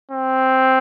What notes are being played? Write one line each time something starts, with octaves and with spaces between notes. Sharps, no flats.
C4